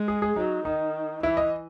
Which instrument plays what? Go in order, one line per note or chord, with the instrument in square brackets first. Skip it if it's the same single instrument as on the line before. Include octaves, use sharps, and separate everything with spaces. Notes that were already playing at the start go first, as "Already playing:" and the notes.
Already playing: [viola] G#3
[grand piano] G#4
G#4
[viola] F#3 [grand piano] D#4
[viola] D#3 [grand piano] D#4
[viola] E3 [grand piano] E4
[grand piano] D#5